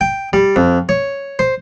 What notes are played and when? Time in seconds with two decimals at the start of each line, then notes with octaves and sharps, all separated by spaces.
0.01 G5
0.33 G3
0.56 F2
0.89 C#5
1.39 C5